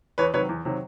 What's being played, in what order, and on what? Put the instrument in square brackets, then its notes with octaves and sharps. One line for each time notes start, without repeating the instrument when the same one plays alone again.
[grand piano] E2 B4 C#5
C3 D#3 F#3 B4 C#5
E2
C3 D#3 F#3